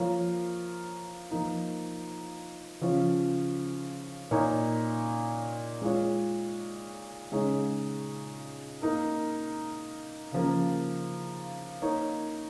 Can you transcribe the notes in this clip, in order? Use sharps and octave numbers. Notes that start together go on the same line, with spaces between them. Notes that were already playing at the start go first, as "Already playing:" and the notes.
Already playing: F3 A#3 F4 A#4 C#5
F3 A#3 D#4
C#3 F3 C#4 F4
A#2 A#3 D#4 C#5
G#3 F4 C#5
C#3 G#3 D#4 G#4 C#5
A#3 D#4 A#4
C#3 F3 A#3
A#3 D#4 A#4 C#5